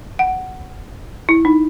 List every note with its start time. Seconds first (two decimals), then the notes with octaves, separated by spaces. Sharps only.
0.19 F#5
1.29 E4
1.45 D#4